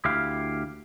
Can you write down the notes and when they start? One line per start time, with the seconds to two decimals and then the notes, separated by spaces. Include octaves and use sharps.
0.05 D2 E4 G4 F5